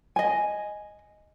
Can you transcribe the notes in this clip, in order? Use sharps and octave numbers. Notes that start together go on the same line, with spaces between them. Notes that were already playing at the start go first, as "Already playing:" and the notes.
D#5 G#5